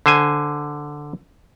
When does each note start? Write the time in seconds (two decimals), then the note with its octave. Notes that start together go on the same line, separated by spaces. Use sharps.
0.06 D3 C5 G#5